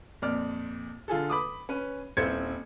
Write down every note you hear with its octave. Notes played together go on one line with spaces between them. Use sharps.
F2 A#2 D5 F6
D3 F4 G#4 A4
B5 D6 D#6
C#4 B4 D#7
D#1 C4 E4 C5 G#6 C#7